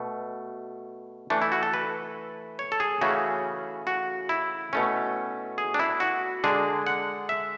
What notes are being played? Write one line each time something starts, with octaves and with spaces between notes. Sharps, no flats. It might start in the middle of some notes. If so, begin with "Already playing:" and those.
Already playing: B2 A3
E3 A3 D4
E4
F#4
A4
B4
C#5
A4
G#4
C#3 E3 A3 C#4 F#4
F#4
E4
B2 A3 C#4
G#4
D4
E4
F#4
D3 G#3 D4 G#4
F#5
E5